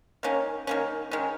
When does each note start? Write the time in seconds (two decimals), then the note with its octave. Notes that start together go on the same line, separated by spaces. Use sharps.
0.23 D#3 A#3 C#4
0.67 D#3 A#3 C#4
1.11 D#3 G#3 C#4